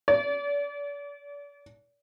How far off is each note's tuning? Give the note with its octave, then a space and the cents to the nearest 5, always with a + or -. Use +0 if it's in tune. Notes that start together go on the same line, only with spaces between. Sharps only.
D5 -40